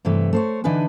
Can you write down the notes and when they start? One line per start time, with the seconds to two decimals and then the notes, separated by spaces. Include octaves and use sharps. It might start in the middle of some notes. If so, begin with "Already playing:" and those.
0.05 G2 C3 E3 A3
0.33 A3 C5 C#5
0.64 D3 E3 D4 D#4 B4 G#5